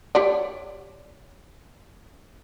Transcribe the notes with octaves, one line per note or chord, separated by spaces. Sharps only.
G4 C#5 D5